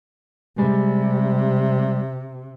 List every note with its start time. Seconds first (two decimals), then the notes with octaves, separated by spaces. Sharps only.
0.58 C3 G3 G#3